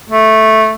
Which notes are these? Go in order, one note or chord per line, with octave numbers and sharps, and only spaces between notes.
A3